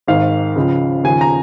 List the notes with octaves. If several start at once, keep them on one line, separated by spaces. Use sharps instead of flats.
G#1 G#2 D#3 F5
C#2 C#3 F3
D#2 C#3 F3 G#5
A#5